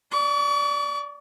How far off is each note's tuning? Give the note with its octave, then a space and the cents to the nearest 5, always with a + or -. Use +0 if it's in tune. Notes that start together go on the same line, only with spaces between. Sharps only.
D5 -10 C#6 +40